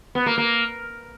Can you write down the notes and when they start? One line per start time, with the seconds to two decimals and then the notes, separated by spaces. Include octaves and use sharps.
0.15 B3
0.26 A#3
0.38 A#3